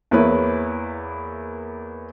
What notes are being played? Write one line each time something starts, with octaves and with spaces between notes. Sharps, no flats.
E2 A#3 B3 E4 B4 C#5